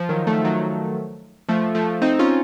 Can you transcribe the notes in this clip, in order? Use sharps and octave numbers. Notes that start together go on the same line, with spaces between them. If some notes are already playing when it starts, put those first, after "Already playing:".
Already playing: F3
D#3 F#3
F3 A3
D#3 F#3
F3 A3
F3 A3
C4 D#4
C#4 F4